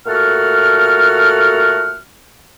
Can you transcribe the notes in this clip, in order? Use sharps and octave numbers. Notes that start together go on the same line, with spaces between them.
A#2 A3 F#4 A4 F#5 F6